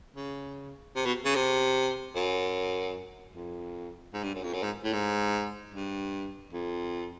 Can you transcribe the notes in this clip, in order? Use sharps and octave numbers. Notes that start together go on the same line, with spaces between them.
C#3
C3
B2
C#3
C3
F#2
F2
G#2
G2
F#2
F2
F#2
G#2
A2
G#2
G2
F2